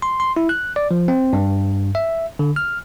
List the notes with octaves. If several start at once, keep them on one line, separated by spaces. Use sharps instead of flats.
C6
C6
E4
F#6
D5
F3
C4
G2
E5
D3
F6